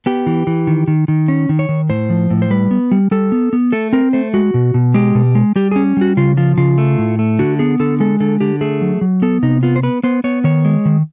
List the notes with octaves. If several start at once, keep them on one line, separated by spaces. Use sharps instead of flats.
B3 G4
E3
E3
D#3
D#3
D#3
C#4
D#3
C#5
D#3
A2 C5
F3
A2
C5
G3 B4
B3
G3
G3 A4
B3
B3
A3 A4
C4 A#4
A3 C5
G#3 F#4
B2
B2
G#3 G4
B2
G#3
G3 G4
C#4 G#4
G3 F#4
C#3 F4
F3 F4
C#3 F4
A3
A2
A3
D3 F#4
B3 G#4
D3 A4
G#3 A4
D3 A4
D3 G4
A3 G#4
F#3
F#3
B3 A4
C3 D#4
B3 F4
C5
B3 B4
B3 C5
B3 C#5
D#3 C#5
G#3
D#3